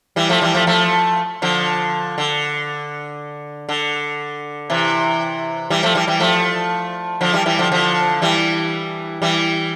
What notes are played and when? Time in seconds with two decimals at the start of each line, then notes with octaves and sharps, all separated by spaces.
0.16 E3 G3
0.29 F3 A3
0.41 E3 G3
0.54 F3 A3
0.67 F3 A3
1.42 D3 F3
2.18 D3
3.69 D3
4.70 C3 E3
5.70 E3 G3
5.83 F3 A3
5.95 E3 G3
6.08 E3 G3
6.20 F3 A3
7.21 D3 F3
7.33 E3 G3
7.46 E3 G3
7.59 D3 F3
7.72 D3 F3
8.22 E3 G3
9.22 E3 G3